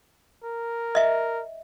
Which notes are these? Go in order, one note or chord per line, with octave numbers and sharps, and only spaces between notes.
A#4
D#5 E5